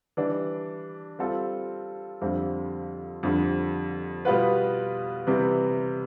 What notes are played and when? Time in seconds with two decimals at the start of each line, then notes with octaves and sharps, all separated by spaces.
0.17 E3 G3 D4
1.19 G3 C4 F4 A4
2.21 F2 D3 G3 C4 F4
3.23 F2 D3 G3
4.25 B2 G3 B3 F4 B4
5.27 C3 E3 G3 B3